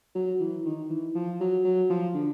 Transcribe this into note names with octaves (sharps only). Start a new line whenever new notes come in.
F#3
E3
D#3
E3
F3
F#3
F#3
F3
D3